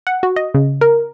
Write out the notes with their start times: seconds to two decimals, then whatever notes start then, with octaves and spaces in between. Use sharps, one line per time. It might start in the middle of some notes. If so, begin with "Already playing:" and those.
0.07 F#5
0.23 F#4
0.36 D#5
0.54 C#3
0.81 A#4